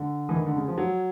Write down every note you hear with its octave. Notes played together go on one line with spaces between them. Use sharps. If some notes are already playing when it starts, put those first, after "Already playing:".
Already playing: D3
E3
D#3
D3
C#3
F3
F#3